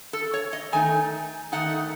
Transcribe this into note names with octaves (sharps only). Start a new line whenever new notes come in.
A4
C#5
D#5
D#3 A3 D#4 G#5
D#3 A3 D#4 F#5